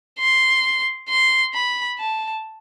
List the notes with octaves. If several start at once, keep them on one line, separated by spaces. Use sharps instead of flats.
C6
C6
B5
A5